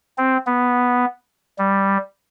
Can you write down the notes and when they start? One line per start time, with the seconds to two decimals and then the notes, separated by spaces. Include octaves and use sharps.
0.18 C4
0.46 B3
1.58 G3